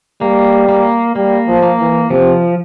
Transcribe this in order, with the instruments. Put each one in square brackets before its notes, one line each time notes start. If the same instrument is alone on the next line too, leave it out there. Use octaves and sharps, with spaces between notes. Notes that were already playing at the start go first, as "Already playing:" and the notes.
[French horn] G3 [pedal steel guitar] A#3
[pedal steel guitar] A#3
[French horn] G3 [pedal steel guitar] A#3
[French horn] F3
[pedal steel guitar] A#3
[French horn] E3
[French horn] C3 [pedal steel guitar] F3